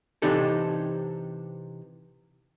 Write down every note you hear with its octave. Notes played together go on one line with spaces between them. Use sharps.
C3 E3 D4 D#4 G4 A4